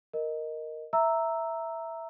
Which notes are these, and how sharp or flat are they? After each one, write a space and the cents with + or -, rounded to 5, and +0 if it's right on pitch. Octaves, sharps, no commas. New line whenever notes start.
A#4 +0 D#5 +0
E5 +0 A#5 -10 E6 -5